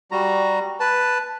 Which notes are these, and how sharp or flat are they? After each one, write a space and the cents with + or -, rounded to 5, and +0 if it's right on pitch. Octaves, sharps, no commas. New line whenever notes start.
G3 +0 F#4 +0 A#5 +0
B4 +0 A5 +0